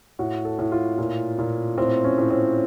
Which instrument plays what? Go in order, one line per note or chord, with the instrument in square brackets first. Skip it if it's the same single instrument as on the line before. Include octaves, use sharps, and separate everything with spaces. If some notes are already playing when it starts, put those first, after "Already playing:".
[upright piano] A2 F#4
A4
A2
F4
A#2
A#2
A2 C4
C#4
A2
C4